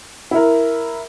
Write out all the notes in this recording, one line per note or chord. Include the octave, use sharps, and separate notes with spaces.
E4 A#4